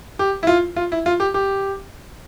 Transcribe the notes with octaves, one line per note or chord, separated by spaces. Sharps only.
G4
E4
F4
F4
E4
F4
G4
G4